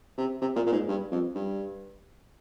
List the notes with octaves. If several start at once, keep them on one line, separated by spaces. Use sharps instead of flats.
C3
C3
A#2
A#2
G#2
G2
F2
G2